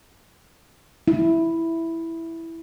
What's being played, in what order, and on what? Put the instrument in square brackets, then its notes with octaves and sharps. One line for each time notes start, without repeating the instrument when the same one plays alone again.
[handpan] E4